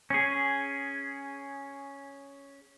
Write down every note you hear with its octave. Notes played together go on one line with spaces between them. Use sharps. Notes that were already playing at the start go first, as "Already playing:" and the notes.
C#4 G#4